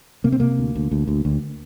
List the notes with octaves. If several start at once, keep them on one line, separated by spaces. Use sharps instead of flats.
C3 A#3
C4
C3 A#3
D2
D2
D2
D2
D2